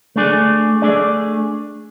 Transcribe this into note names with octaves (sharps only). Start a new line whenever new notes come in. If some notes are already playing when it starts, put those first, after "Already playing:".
A3 D4 G#4 D5
A3 D4 G#4 D5